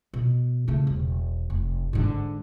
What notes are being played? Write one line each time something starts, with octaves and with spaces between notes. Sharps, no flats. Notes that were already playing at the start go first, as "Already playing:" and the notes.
B2
C#3 A3
E1
F1
G#2 D3